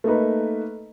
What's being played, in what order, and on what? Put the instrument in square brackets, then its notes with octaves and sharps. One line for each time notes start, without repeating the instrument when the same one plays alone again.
[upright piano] A3 A#3 D#4 B4